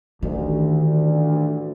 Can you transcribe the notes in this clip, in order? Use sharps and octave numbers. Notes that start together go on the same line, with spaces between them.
A1 D2 D#3